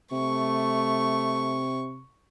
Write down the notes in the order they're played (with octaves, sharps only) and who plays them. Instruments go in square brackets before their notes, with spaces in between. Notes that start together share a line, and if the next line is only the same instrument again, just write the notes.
[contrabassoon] C3 [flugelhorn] A3 [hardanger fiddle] C#6